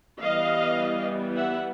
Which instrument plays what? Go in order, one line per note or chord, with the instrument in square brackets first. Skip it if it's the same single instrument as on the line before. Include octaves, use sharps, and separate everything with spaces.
[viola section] E3 G3 B3 D#5 F5
E5 F#5